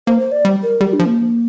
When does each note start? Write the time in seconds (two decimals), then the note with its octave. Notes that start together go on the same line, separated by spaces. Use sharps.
0.07 A#3 C5
0.20 C5
0.32 D5
0.45 G3
0.63 A#4
0.81 G3 G4
0.93 D4
0.99 F3
1.06 A#3